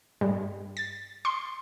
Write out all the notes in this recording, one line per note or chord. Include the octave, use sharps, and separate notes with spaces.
G2
A6
C6